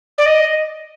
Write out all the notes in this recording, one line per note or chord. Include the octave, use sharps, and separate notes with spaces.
D5
D#5